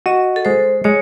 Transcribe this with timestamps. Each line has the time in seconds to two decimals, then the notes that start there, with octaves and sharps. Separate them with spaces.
0.06 F#4 D#5
0.36 A4
0.45 G#3 C5
0.84 G#3 C#5